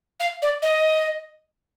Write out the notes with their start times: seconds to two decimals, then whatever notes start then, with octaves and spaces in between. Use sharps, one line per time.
0.20 F5
0.42 D5
0.62 D#5